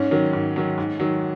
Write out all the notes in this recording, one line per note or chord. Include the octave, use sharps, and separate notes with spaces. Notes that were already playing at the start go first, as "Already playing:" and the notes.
Already playing: G#2 C#4
D#3 F#3
G#2
D#3 F#3
G#2
D#3 F#3